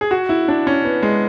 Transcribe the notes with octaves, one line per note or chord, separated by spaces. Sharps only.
G#4
F#4
E4
D4
C#4
B3
G#3